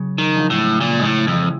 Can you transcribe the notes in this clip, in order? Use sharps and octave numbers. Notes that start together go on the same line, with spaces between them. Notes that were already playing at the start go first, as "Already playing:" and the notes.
Already playing: C#3 F#3
D#3
F3 G#3 B3 D4
A2
A#2 C#3
G#2
A2
F2 E3 G#3 C4 F4